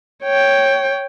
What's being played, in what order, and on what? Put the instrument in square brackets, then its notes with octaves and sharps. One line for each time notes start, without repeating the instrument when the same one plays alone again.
[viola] C#5 G5